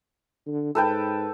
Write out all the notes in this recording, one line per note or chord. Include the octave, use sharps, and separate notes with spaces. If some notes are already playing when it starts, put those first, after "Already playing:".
D3
G#2 A4 B4 G5